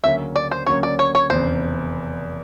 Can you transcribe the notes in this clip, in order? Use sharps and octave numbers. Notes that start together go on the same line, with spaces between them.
D2 C#3 F#3 A#3 C#4 E5
D5
C5
D2 C#3 F#3 A#3 C#4 C#5
D5
C#5
C#5
F1 E2 C#3 C5